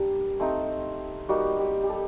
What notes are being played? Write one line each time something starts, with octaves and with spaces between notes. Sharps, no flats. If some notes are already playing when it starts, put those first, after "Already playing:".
Already playing: G3 A#3 D4 G4
A3 C4 D#4
G3 A#3 D#4 F#4
G4
G4
A4